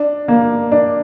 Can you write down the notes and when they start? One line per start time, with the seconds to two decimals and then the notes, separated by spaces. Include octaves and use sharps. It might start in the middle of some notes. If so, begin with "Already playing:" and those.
Already playing: D4
0.28 A#3
0.72 D4